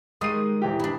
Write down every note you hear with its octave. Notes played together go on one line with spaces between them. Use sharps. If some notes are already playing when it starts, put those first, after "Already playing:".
D#3 G3 G#3 D#6 C7 D#7
D#1 E3 G4
D4 E4